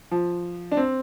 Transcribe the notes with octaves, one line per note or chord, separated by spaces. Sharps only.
F3
D4
C4